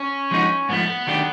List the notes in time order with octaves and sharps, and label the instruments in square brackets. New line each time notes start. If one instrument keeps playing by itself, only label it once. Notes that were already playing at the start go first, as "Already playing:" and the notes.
Already playing: [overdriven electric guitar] C#4
[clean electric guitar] F3 G#3 B3 D#4 F#4
[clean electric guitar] G#2 F3 A3 [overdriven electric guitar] B3
[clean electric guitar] D#3 F#3 A3 D4 G4